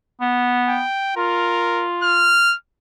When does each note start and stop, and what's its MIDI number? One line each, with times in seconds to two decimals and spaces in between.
0.21 0.82 59
0.68 1.15 79
1.17 2.45 65
1.17 1.87 70
2.03 2.56 89